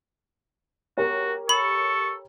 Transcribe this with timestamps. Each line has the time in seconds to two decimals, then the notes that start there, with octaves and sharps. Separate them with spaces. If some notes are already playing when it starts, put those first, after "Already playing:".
0.97 F#4 G4 A#4 C#5
1.49 A4 B5 C#6